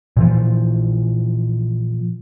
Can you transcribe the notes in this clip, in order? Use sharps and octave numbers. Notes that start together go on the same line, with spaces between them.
A#2 E3 F3